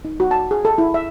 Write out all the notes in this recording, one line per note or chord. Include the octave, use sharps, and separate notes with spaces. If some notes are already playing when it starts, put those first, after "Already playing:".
D#4
F#4
A5
G#4
A4
E4
E5